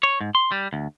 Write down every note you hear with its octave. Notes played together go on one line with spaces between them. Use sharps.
C#5
G#2
C6
G3
D2